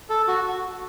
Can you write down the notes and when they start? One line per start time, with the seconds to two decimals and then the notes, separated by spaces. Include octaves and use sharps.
0.10 A4
0.28 F#4